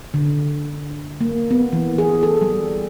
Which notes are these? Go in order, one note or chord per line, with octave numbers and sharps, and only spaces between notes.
D3
A#3
B3
E3
G#4
A4
G3